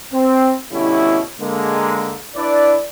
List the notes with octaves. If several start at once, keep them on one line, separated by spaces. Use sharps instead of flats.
C4
B2 D3 G3 C#4 E4
D3 G#3 A#3
D4 E4 B4 D5